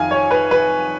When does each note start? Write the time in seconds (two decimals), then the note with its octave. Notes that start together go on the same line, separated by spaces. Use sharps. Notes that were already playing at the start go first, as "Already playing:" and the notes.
Already playing: F2 D#3 F5 G#5
0.11 C#5
0.31 B4
0.51 B4